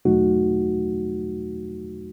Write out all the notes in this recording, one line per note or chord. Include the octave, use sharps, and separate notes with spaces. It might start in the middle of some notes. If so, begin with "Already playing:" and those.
E2 B2 F#3 A3 D#4 F#4